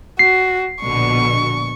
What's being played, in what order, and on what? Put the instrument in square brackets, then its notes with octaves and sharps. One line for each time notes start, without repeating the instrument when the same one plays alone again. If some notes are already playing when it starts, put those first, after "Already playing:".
[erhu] F#4 [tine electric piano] C7
[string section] A#1 B2 D3 [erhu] C#6